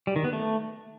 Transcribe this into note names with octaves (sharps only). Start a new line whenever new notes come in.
G3
D#3
B3
A3